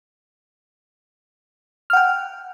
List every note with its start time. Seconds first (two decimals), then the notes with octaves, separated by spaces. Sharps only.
1.90 F6
1.93 F#5
1.97 G5